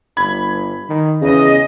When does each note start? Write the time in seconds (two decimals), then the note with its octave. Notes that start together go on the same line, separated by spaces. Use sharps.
0.17 G1 B5 G#6
0.89 D#3
1.22 E2 C#3 D#5